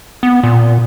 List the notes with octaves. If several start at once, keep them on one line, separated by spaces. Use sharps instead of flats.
B3
A#2